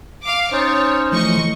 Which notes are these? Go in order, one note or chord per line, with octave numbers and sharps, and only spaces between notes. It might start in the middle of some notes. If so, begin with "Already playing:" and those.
F5 D6
C#4 D#4 C5 C#5 A6
E3 F3 A3 D#5 C#6